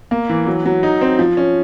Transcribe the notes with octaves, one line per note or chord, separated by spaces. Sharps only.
A#3
E3
F#3
F#3
D#4
C4
F3
C#4